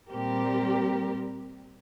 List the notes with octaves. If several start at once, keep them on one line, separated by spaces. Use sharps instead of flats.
A#2 G3 C4 G4 A#4